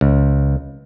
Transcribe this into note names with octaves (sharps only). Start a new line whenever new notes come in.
C#2